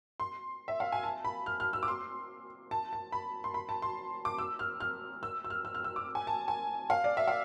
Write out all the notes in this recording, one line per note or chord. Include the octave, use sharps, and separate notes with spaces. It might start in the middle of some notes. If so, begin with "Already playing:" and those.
C6
E5
F5
G#5
A5
B5
F6
F6
E6
D6
C6
A5
A5
B5
C6
B5
A5
C6
D6
E6
F6
F6
E6
E6
F6
E6
F6
E6
D6
G#5
A5
G#5
F5
D5
E5
F5